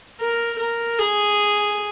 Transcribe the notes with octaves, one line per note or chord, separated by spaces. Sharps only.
A#4
A#4
G#4